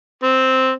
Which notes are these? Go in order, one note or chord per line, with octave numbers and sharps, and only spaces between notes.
C4